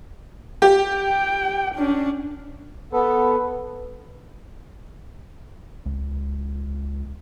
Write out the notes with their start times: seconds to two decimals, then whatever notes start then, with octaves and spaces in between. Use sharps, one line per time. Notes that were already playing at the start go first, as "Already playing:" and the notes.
0.62 G4
0.96 G5
1.75 C#4 D4
2.93 B3 A4 B4
5.86 C#2